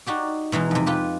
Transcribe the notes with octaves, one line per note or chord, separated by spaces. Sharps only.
D#4 F#4 G4 D5
B2 E3 G#3 D#4
F2 C3
F4 G4 B4